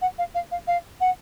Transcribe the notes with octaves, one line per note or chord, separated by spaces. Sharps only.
F#5
F5
F5
F5
F5
F#5